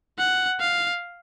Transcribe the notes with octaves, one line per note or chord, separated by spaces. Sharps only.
F#5
F5